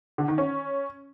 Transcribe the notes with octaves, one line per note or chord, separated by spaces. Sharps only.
D3
D#3
C#4